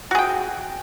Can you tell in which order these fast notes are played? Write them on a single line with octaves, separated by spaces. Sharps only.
F#4 G#4 G5